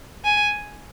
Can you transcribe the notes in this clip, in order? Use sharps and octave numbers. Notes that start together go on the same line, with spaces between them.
G#5